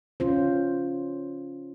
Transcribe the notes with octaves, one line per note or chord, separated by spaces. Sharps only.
C#4 F4 C5